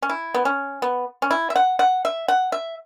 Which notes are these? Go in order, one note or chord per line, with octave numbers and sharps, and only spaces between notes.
C#4
E4
B3
C#4
B3
C#4
E4
E5
F#5
F#5
E5
F#5
E5